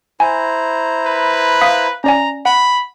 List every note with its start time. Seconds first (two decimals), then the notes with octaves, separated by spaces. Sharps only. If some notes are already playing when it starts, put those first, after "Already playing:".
0.20 E4 C5 G#5 A#5
1.07 B4
1.61 F5 D#6 B6
2.04 C#4 D5 G#5 A#5
2.45 F#5 B5